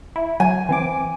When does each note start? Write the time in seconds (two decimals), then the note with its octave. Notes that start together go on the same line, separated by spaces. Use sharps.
0.16 E4
0.40 F#3 G#5
0.69 E3 C4 D6